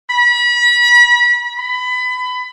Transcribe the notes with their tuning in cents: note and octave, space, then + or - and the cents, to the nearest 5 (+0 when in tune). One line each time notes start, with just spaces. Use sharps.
B5 -35
B5 +25